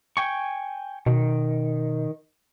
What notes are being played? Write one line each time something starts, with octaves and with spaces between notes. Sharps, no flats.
G5 G#5 C#6
B2 D#3